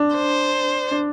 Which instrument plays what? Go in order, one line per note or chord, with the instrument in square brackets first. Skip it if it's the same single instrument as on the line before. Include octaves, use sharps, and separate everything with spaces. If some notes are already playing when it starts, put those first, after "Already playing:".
Already playing: [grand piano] D4
[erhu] C5
[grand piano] D4